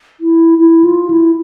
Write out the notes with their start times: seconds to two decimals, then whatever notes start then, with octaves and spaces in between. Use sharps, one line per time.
0.20 E4
0.58 E4
0.84 F4
1.10 E4